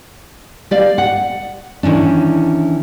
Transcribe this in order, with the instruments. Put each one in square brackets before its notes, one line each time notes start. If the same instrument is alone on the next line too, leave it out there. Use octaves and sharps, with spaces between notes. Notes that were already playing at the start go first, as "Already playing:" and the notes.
[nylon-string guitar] G4 D5 F5
F#5
D#3 E3 C#4 D4